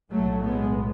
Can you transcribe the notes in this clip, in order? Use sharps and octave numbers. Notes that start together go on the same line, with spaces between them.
B1 A2 F#3 A3
G#3 B3